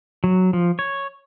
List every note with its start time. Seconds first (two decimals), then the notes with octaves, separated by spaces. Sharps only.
0.24 F#3
0.53 F3
0.79 C#5